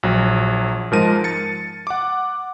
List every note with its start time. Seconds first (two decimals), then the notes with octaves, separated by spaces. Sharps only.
0.03 A#1 F#3
0.91 G#2 F3 G#3 A#4 A5 D#7
1.24 A6 C#7
1.87 F#5 D6